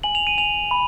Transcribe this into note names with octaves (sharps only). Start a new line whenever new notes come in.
G#5 F#7
F7
D#7
G#5 F7
B5